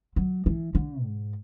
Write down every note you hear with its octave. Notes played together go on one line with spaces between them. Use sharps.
F#3
E3
D3
G#2